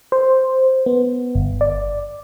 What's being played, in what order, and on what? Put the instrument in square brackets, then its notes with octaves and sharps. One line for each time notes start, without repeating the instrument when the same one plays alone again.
[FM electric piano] C5
B3
G1
D5